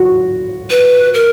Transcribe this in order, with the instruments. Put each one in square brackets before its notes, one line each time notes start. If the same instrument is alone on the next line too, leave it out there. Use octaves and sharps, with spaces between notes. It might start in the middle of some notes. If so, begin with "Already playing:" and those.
Already playing: [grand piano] F#4
[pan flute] B4
A#4